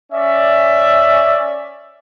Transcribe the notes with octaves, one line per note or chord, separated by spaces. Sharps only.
C#4 D5 E5